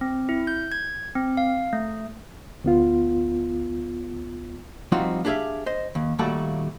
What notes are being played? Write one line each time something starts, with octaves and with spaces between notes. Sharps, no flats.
C4
E4
G6
G#6
C4
F5
A3
D2 B3 F4
F3 G3 C4 D#4 F4 F#4
D4 G4 G#4 B4 E5 F5
C5 D#5
D#2
D#2 A#2 G3 A3 F#4 A5